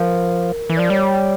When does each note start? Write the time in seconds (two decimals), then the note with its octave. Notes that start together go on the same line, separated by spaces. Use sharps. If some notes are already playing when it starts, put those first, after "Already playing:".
Already playing: F3 A#4
0.70 E3
0.77 F3 D5
0.90 G3 C#5